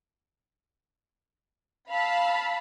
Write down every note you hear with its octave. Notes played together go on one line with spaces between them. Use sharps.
F5 A5 B5 E6